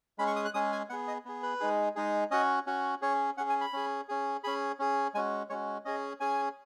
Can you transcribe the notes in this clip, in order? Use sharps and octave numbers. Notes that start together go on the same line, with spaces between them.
G#3 C#4 G#4 B5
C#6
D#6
F#6
G#3 C#4 G#4 D#6
G#5
B3 G#4 F#5
D#5
B3 G#4
B4
G#3 D#4 G#4
G#3 D#4 G#4
C#4 F#4 D#5
C#4 F#4
C#4 G#4 C#5
C#4 G#4 F#5
G#5
B5
C#4 G#4
C#4 G#4
C#4 G#4 B5
C#4 G#4
G#3 C#4 F#4 G#5
G#3 C#4 F#4 C#5
C#4 G#4 D#5
C#4 G#4 G#5